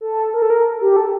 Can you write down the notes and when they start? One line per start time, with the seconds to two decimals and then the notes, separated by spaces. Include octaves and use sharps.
0.01 A4
0.34 A#4
0.42 A4
0.50 A#4
0.81 G4
0.97 A4